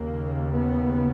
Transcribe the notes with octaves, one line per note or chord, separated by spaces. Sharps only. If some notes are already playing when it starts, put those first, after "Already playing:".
Already playing: D#2 C#3 A#3
B3